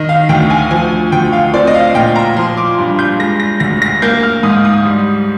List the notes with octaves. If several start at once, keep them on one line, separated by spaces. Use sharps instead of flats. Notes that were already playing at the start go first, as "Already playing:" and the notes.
Already playing: D#3 D#5
F5
D2 G5
G#5
F3 G#5
D2 G5
F5
C4 D5
D#5
F5
A#2 G5
A#5
F3 C6
D6
G2
G6
G#3 A#6
A#6
D2 A#6
A#6
A#3 G6
F6
G#2 D#6
D#6
G3